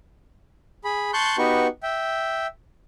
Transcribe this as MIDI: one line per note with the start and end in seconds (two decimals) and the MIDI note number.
0.84 1.11 68
0.84 1.11 83
1.13 1.37 81
1.13 1.37 84
1.13 1.37 85
1.13 1.37 90
1.13 1.37 91
1.38 1.67 59
1.38 1.67 63
1.38 1.67 66
1.38 1.67 67
1.38 1.67 71
1.38 1.67 85
1.83 2.47 76
1.83 2.47 79